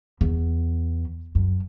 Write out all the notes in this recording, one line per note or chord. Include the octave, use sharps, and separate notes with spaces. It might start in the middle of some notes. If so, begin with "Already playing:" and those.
E2
F#2